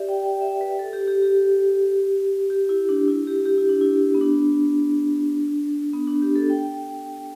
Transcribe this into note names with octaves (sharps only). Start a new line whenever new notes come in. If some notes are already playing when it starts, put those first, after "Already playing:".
Already playing: G4 D5 E5
G5
G5
E5
B4
A4
G4
G4
G4
G4
E4
D4
E4
G4
G4
E4
D4
E4
B3
D4
B3
D4
G4
A4
G5